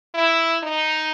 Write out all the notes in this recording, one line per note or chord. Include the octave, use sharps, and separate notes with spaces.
E4
D#4